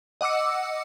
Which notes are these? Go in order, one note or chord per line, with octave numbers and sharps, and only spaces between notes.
D#5 F#5 D6 E6 C#7